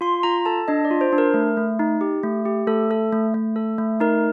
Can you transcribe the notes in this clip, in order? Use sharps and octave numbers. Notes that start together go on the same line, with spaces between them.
F4 C6
F4 A#5
A4 A5
D4 D#5
D5
F4
C5
D4
A#4
A3
A3
D#4
G4
A3
G4
A3 A4
A4
A3
A3
A4
A3
D#4 A#4